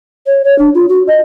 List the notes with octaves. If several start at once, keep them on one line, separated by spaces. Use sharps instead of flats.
C#5
C#5
D4
F4
F#4
D#5